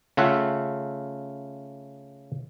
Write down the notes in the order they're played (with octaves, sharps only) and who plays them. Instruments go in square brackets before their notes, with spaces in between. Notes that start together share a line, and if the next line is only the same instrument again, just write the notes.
[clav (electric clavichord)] C#3 A3 F4 E5 F#5